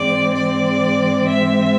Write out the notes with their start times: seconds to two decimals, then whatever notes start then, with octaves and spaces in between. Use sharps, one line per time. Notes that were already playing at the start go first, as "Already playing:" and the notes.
Already playing: G#2 E3 G#3 C4 D5
0.33 D5
1.28 E5